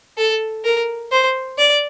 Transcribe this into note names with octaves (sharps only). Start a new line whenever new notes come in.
A4
A#4
C5
D5